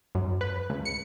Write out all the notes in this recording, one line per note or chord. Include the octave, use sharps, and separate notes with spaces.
F#2
B4
C#2
C#7